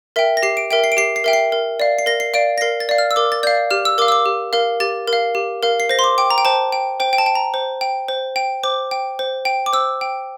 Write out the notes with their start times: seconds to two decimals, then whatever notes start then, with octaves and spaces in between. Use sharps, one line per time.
0.16 A#4 E5 G5
0.37 A#6
0.43 G4 C7
0.57 D7
0.71 A#4 E5 G5 D7
0.84 C7
0.92 D7
0.97 G4 C7
1.16 C7
1.24 A#4 E5 G5
1.33 C7
1.52 A#4
1.80 D5 F5
1.99 C7
2.06 A#4 A#6
2.20 C7
2.34 D5 F5 D7
2.58 A#6
2.61 A#4 C7
2.80 A6
2.89 D5 F5
2.98 F6
3.11 E6
3.16 A#4 D6
3.32 A6
3.43 D5 F5 G6
3.70 G4 F6
3.85 E6
3.98 A#4 F5 D6
4.08 E6
4.12 D6
4.26 G4
4.53 A#4 F5
4.80 G4 A6
5.07 A#4
5.13 F5
5.35 G4
5.63 A#4 F5
5.80 C7
5.89 C5 A#6
5.99 C6
6.04 D6
6.18 G5 D6
6.31 A#5
6.38 G5
6.45 C5 A5
6.72 G5
7.00 C5 G5
7.13 G5
7.18 A5
7.26 G5
7.35 A#5
7.54 C5
7.81 G5
8.08 C5
8.36 G5
8.63 C5 D6
8.91 G5
9.19 C5
9.45 G5
9.66 D6
9.73 C5 E6
10.01 G5